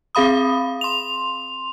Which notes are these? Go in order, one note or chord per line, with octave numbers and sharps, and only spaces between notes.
C4 G#4 F5 B5 D#6
C6 F7